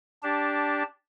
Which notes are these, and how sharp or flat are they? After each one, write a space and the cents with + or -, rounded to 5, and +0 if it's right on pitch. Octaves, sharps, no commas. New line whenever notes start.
D4 -10 G4 +0 A5 +0